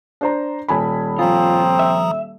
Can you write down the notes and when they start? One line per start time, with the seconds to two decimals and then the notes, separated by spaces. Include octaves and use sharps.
0.21 D4 C5 A#5
0.68 D#1 G#5 B5
1.19 F3 C4 F4 A#5 D#6
1.79 E5